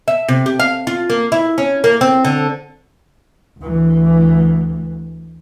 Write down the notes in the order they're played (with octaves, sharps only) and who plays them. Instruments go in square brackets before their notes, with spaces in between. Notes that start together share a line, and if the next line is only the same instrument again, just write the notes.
[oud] E5
C3
G4
F5
F4
A#3
E4
C#4
A#3
C4
D3
[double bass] D2 E3